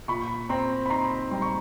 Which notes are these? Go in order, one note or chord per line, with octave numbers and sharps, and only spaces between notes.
A#2 B5 C#6
C4 A#5 C6
B5
D#4 A#5 C6
G3 C6
C#6